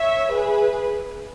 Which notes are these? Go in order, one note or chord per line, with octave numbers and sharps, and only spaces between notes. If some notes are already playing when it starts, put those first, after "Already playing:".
Already playing: C#5 E5
G#4 B4